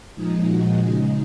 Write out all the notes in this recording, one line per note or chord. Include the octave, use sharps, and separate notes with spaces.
A#2 F3 G#3 D#4 G#4
F#4
C#3 G#3 D#4 G#4